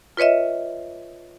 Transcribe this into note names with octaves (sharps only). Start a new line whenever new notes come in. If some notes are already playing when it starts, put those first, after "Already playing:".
F4 B4 C#5 D#5 E5